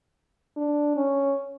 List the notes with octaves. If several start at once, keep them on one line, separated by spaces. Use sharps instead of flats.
D4
C#4